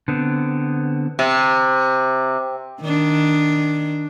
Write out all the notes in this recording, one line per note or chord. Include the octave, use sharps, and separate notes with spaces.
D3 B3 C4
C3
D#3 D4